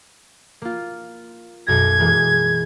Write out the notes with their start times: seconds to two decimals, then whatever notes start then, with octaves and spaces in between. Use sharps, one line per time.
0.62 A#3 F4
1.67 B1 F#2 G#6 A#6
1.99 E3 G#3 A#3